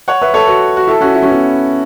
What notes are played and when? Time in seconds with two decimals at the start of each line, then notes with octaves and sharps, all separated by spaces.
0.08 C#5 F#5
0.22 B4 E5
0.34 A4 C#5
0.47 F#4 B4
0.77 F#4
0.87 E4 A4
1.01 C#4 F#4
1.14 E4
1.23 C#4
1.31 B3 E4